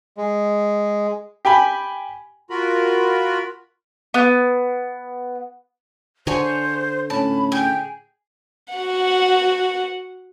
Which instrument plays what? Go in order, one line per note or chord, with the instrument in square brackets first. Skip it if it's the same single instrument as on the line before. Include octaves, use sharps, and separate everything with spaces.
[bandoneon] G#3
[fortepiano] G4 G5 G#5 B5
[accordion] F4 F#4 A#4 B5
[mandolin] B3
[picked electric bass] D3 [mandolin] G#4 C#5 G#5 [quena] C5
[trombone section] A2 C#4 [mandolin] A5 [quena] B5
[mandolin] G#4 [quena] G5
[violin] F#4 F#5